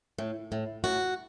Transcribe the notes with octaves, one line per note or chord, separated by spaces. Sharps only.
A2
A2
A2 F#4